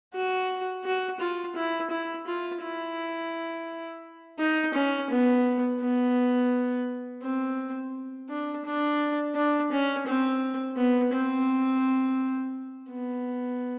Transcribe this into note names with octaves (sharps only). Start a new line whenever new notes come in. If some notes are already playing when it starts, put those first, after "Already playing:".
F#4
F#4
F4
E4
E4
F4
E4
D#4
C#4
B3
B3
C4
D4
D4
D4
C#4
C4
B3
C4
B3